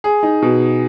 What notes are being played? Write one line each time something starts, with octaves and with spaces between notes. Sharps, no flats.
G#4
D#4
B2